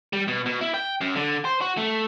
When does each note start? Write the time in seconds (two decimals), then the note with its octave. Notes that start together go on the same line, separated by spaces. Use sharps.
0.13 G3
0.28 B2
0.46 B2
0.61 E4
0.74 G5
1.01 F#2
1.16 D3
1.45 C5
1.61 F#4
1.77 A3